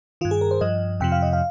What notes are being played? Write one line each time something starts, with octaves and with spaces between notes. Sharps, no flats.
G2 D#3 F4
G#4
A#4
C5
G2 F3 D#5
F2 C3 F3 G5
F5
D#5
F5